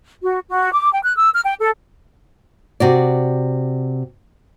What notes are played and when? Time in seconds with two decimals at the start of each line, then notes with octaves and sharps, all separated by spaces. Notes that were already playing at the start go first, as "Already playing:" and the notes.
0.23 F#4
0.48 F#4
0.73 D6
0.92 G5
1.04 F#6
1.17 E6
1.33 F6
1.45 G5
1.60 A4
2.80 C3 F#4 D5